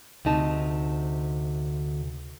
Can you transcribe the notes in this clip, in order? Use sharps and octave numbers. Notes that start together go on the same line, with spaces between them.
D2 C3 D#4 A5